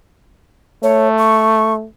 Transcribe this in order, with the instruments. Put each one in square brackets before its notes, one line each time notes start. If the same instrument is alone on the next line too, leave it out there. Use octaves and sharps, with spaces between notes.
[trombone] A3 [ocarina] C#5
[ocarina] C#6